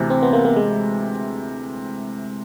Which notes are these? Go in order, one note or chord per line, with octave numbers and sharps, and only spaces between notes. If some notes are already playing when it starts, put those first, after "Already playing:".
Already playing: D2 C3 E3 C4
C4
B3
A#3
A#3
G#3